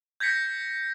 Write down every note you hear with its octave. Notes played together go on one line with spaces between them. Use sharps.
G6 G#6 A#6 B6 C#7